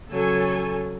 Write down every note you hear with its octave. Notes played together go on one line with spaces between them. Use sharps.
C#3 F#3 A4 G#5